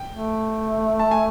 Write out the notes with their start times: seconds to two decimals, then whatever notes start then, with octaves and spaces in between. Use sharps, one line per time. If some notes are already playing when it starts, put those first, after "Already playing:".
Already playing: G5
0.12 A3
0.99 A5
1.11 G#5